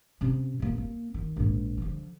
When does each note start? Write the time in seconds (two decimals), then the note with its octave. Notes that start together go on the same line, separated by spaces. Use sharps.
0.21 C3 C#4
0.60 A#2 A#3
0.78 A#3
1.14 D#3
1.36 A#1 G#2
1.77 D3 F3